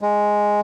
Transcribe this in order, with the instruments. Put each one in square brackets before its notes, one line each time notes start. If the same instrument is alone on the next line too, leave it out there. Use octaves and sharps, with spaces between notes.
[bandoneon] G#3